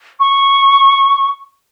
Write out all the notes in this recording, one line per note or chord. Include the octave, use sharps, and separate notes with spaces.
C#6